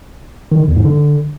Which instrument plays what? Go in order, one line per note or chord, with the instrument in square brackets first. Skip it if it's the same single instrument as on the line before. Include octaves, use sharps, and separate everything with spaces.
[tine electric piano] D#3
D3
E2
G#2
D3